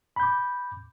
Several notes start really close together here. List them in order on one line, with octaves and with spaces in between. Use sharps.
B5 G6 D6